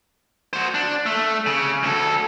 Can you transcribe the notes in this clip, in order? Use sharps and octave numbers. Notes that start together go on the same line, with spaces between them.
F#4 C5
D4
A3
C#3
D2 A4